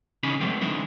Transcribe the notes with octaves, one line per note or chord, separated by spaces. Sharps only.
C#3 E3 C#4 D#4 G#4 B5
F#3 G#3 A3 B3 C4
D3 E3 G#3 C4 D#4 E4